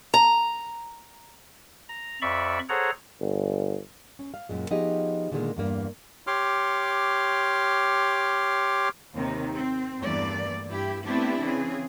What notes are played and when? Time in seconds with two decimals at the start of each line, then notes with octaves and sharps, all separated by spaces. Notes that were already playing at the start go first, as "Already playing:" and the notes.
0.14 A#5
1.89 A#5
2.22 F2 D5 E5 B5 C#6
2.69 G#4 A4 C5 C#5 F#5 A#5
3.21 G1
4.19 C#4
4.34 F5
4.49 F#2 A#2 G#3
4.70 F3 B3 D#4 G4 G#4 D#5
5.32 A#2 D3 D#3 F3 G#3 A#3
5.56 E2 G2 A#3
6.27 G4 C#5 C6 D6 F6
9.14 D#2 C3 D#3
9.54 C4
10.00 E2 G2 E3 A3 A#3 D5
10.67 G2 E4 G4
11.04 A3 B3 C4 D4 E4 G4
11.41 C#3 E3 C4 G#4